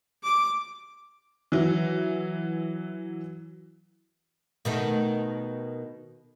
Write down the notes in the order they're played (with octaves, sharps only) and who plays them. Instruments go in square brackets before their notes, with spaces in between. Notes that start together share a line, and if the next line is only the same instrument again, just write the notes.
[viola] D6
[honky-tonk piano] E3 F#3
[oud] B2 D#3 A3